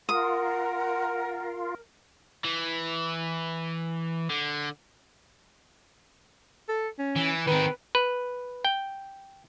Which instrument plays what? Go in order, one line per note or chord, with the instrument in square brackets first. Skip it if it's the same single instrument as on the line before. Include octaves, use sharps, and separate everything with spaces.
[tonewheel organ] F4 [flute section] A#4 [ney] F#5 [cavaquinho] D#6
[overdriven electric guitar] E3
D3
[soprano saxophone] A4
C#4
[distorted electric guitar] E3
[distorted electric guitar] D#3 C4 [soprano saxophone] B4
[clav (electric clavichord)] B4
G5